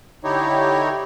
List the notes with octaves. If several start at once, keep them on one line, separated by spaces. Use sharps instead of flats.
D3 D#4 E4 G4 C#5